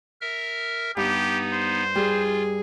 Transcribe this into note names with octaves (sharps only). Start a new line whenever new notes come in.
A#4 E5 F6
G2 B3 D#4 G4
C5
G3 F4 G#4